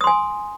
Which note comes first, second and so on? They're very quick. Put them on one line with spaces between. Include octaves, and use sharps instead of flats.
D#6 C6 G#5